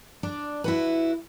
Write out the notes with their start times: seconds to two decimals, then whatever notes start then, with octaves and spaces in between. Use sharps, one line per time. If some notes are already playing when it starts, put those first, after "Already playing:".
0.23 D4 D5
0.64 E4 F#4 B4